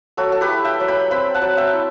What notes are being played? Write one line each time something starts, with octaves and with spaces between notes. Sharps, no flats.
F#3 F#4 A4
A4
G4 B4
E4
E5 G5
F#3
G5 B5
C4 G5 B5
F#5 A5
F#3
E5 G5
E4